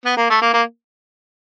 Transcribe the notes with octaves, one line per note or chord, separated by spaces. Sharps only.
B3
A#3
A3
A#3
A#3